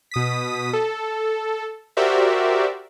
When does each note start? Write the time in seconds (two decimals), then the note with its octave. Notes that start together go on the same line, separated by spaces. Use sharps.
0.11 B2 D#6 B6
0.73 A4
1.97 F#4 G4 A#4 C5 D5 E5